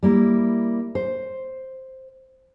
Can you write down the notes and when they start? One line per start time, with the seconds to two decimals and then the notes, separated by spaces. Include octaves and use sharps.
0.03 G3 A#3 E4
0.95 C5